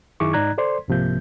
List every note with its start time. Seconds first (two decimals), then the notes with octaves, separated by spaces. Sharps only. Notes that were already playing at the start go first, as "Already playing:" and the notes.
0.20 F#2 D#3 E4 G#4 C#6 D6
0.33 G#2 D#4 D5 A#5 F#6 G#6
0.58 A4 C5 D5 C6
0.88 C2 G#2 C3 F3 A#3 G6